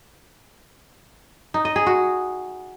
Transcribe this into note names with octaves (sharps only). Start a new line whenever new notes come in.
D#4
D#5
G#4
F#4